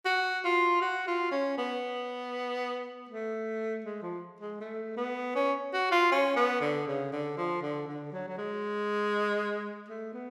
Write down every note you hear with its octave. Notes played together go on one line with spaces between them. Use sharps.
F#4
F4
F#4
F4
C#4
B3
A3
G#3
F3
G#3
A3
B3
C#4
F#4
F4
C#4
B3
D3
C#3
D3
F3
D3
D3
F#3
F#3
G#3
A3
B3